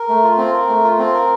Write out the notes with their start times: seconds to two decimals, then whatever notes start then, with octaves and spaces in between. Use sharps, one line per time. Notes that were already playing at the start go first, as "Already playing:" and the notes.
Already playing: A#4
0.09 A3
0.24 F4
0.38 C4
0.54 A#4
0.69 A3
0.84 F4
0.99 C4
1.14 A#4